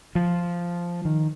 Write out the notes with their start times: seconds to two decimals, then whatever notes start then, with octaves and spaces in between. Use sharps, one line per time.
0.15 F3
1.05 D#3